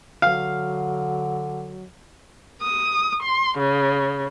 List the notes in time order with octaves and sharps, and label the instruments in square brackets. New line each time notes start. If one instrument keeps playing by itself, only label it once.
[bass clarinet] D3 [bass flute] F#3 [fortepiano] F5
[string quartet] D#6
C6
C#3